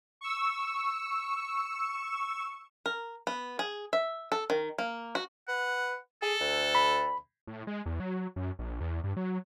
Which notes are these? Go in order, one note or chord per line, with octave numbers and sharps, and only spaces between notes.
C#6 E6
A#4
B3
G#4
E5
A4
D#3
A#3
F#4
B4 F#5
G#4 A4
D2
B5
A2
G#3
E2
F#3
F#2
A#1
E2
G2
F#3